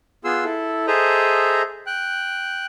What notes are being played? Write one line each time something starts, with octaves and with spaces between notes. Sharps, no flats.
B3 F4 G#4 C6 E6
E4 A4
G#4 A4 C5 D#5 E5 A#5
G5 F#6